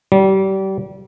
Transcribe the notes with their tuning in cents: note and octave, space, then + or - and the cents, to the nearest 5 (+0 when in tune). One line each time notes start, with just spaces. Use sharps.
G3 -30